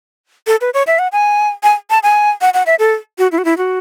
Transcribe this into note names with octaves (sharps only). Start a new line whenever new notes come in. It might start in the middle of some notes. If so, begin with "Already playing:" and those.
A4
B4
C#5
E5
F#5
G#5
G#5
A5
G#5
F#5
F#5
E5
A4
F#4
E4
F#4
E4
F#4